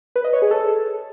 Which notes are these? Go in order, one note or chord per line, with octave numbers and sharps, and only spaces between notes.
B4
D#5
C#5
G#4
A4